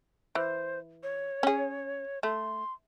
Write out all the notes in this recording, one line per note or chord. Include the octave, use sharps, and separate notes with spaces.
E3 C5
C#5
C#4 G#4
A3 C6